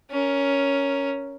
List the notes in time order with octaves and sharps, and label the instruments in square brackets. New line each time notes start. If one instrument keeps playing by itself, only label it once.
[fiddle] C#4 A#4